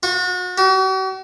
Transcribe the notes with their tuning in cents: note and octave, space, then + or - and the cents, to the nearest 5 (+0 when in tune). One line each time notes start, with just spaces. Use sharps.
F#4 -35
F#4 +45